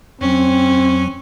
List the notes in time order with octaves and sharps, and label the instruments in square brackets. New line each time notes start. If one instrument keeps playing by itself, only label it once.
[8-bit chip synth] F2 F#3 [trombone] C4 [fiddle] C#4